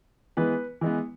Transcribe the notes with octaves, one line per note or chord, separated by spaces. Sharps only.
E3 G#3 B3 B4
E3 G#3 B3